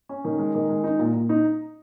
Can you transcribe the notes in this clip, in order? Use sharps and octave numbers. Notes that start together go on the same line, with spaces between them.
C#4
D#3
G#3
D#3
G#3
D#4
A#2
A#2
D#4